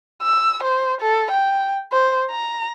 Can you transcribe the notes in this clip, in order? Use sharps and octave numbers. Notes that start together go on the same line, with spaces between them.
E6
C5
A4
G5
C5
A#5